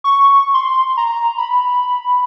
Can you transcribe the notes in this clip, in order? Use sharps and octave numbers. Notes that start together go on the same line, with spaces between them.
C#6
C6
A#5
B5